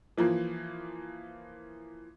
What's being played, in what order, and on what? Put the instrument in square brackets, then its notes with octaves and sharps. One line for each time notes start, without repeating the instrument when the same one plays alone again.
[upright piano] E3 F3 A#3